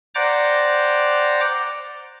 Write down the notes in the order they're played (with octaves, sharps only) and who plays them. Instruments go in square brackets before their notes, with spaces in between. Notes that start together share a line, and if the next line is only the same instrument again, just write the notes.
[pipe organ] C5 D5 F#5 G5 A#5 D6